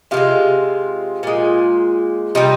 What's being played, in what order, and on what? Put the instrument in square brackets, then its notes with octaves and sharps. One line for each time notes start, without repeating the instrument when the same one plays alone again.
[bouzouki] C3 D#3 F4
G#3
A#2 G#3
C3 G3 D#4